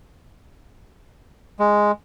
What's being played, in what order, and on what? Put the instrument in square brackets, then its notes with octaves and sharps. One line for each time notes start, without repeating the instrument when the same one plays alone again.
[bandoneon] G#3